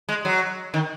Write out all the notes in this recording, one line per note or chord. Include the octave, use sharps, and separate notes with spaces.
G#3
F#3
D#3